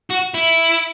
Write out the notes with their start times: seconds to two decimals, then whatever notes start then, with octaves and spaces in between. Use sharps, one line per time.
0.10 F#4
0.34 E4